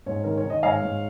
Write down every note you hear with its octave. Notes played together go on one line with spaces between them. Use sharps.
G#2 C#5
D#3 A#4
C#5
D#3
D#5
G#2 C#5 F5
G#2